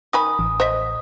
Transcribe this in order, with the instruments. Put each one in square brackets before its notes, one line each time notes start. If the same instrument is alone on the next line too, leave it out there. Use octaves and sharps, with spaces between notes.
[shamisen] D#3 G#5 B5 [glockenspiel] D#6
[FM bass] A1
[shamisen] C5 D#5 E5